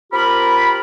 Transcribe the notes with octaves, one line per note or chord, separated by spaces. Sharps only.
C4 F4 G4 A#4 B5